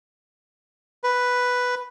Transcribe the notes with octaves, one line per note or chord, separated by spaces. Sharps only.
B4